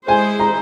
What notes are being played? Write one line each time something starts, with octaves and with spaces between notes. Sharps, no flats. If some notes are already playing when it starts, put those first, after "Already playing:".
G#3 E4 G#4 C5 G#5
A#5